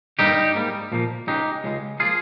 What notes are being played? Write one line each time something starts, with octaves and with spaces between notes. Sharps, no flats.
G2 G3 A#3 D#4 G4
G#2 G3 A#3
A#2 F3 A#3
C#2 C#3 G#3 D#4 G4
C#2 C#3 G#3
F3 A#3 F4 G#4